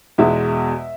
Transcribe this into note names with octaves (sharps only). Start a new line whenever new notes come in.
E2 B2 G#3 E5